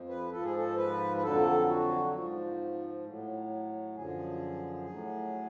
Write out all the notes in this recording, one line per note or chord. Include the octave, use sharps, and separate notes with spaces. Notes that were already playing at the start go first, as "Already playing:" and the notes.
Already playing: F2 F3
B4
G#2 F3 A4
G#4
A4
B4
B4
F2 D3 F#3 A4
F#4
G#2 F3
A2 F#3
F#2 D3 F3 G#4
A2 F#3